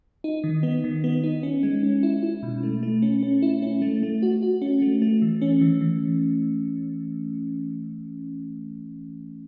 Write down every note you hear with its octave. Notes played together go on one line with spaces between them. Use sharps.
D#4
D#3
B3
D#3
B3
D#4
C#4
G#3
C#4
E4
E4
B2
A3
A3
C#4
C#4
E4
C#4
A3
A3
F#4
F#4
C#4
A3
A3
E3
C#4
E3
E3